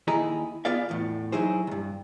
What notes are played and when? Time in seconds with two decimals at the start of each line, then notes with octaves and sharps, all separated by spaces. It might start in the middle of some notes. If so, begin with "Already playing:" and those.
0.07 D#2 E4 G#4 D#5 A#5
0.65 B3 F4 G#4 D5 F5
0.89 E2 A2
1.32 F#3 D#4 E4 G#4 C5
1.67 C#2 G2